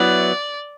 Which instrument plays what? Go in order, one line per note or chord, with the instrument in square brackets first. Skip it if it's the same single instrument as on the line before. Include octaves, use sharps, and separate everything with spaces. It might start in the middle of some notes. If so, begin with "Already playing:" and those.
Already playing: [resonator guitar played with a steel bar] F#3 B3 E4 [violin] D5